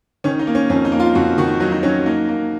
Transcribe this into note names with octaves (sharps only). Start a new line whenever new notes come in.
D#3 C#4
D#4
A#3
C#4
F2 C#4
D#4
A#3
F4
F2 F#4
D#3 F#4
F#3 D#4
D#4
F#3 C#4
A#3 D#4
A#3